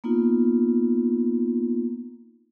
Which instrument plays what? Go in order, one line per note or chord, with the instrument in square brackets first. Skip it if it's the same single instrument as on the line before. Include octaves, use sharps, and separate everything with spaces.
[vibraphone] A#3 B3 D#4 F4